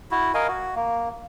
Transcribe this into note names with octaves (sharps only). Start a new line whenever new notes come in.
E4 F#4
A#4 D#5 F5 G#5
F#4
A#3